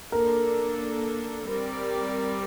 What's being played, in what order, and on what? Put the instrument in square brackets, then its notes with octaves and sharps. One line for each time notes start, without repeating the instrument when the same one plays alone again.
[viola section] A#3 D4 A4 [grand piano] A#4
[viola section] G3 C4 G4 A#4 D5